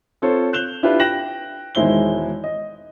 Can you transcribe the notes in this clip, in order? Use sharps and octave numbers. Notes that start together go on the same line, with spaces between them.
C4 F4 A4 C5 C#5
F#6 G6 E7 F7 G7
D4 E4 F4 G4 B4
G5 F#6 A#6 E7 F#7
E1 D#3 G#3 E4 C5 G7
D#5